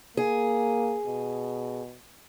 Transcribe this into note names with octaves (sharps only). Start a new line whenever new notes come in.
A#3 G#4
B2